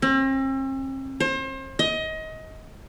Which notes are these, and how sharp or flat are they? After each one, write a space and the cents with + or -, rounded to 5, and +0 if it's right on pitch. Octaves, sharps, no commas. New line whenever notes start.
C4 +45
C5 +35
D#5 +25